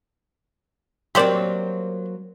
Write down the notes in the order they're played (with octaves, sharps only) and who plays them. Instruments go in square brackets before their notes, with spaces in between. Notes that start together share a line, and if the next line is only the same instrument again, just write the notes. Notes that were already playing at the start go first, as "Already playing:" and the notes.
[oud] F#3 A#3 C4 [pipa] G4 C5 D5